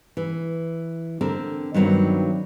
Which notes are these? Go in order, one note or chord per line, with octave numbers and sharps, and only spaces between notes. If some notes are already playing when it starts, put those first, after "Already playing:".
E3
D3 C4 A#4
G2 D#3 F#3 B3 C4